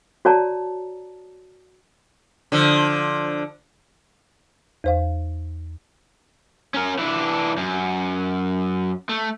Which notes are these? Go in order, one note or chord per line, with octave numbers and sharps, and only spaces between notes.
F#4 C#5 D5 A5 A#5
D3 F3
E2 C5 F5
C#4 A#4
E3 D4
F#2
A3